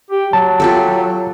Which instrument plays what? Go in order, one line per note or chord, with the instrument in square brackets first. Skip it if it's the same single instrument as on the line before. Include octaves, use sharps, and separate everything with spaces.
[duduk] G4
[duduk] F#3 [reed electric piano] A5
[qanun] F4 G4 A4